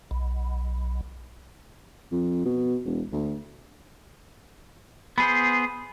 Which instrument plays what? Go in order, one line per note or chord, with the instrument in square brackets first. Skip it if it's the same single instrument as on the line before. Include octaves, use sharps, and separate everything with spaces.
[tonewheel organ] B1
[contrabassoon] F2
B2
E1
D2
[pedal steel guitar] B3 G#4 C5 [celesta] B5